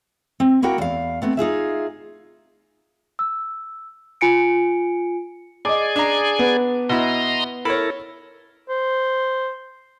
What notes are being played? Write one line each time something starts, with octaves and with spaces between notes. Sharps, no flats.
C4
A#3 E4 F#4 A#4 F#5 G5
E2 F5
A3 B3 C4
D#4 F4 G#4 E5
E6
F4 G#5 C#7 D7
G#4 D5 D#5 G#5 D6
D4 A#5
B3
B2 E4 D#5 A#5 C6
E4 A4 A#4 C#5 B5
C5